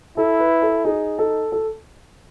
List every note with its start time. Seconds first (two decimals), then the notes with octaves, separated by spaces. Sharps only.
0.17 E4 A4
0.40 B4
0.62 A4
0.85 D#4 G#4
1.19 A4
1.52 A4